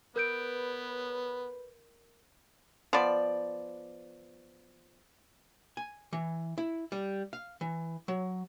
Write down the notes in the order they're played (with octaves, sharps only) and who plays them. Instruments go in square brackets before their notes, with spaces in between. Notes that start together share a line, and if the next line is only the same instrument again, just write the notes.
[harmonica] B3 [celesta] A#4 G6 D7 [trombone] B4
[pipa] F3 B3 D5
[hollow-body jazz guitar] G#5
E3
E4
G3
F5
E3
F#3